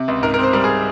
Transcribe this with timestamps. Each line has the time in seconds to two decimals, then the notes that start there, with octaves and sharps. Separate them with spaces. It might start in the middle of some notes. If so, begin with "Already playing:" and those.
Already playing: C3
0.08 C#2
0.23 G#2 A#4
0.34 A#4
0.39 C4 C5
0.53 G3 A#4
0.64 G#4